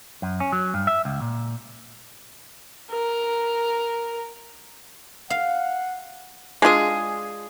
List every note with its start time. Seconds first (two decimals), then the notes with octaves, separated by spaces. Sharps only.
0.22 F#2
0.40 C#4
0.52 F#3
0.74 G2
0.87 E5
1.05 C#2
1.22 A#2
2.91 A#4
5.30 F5 F#5
6.62 G#3 D4 F4 G#4